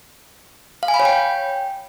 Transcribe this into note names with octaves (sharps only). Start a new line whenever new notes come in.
F5
G#5
B5
C#5
G5